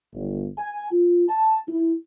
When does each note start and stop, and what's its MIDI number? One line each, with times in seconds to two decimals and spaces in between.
0.14 0.46 31
0.58 0.89 80
0.92 1.24 65
1.29 1.57 81
1.69 1.93 64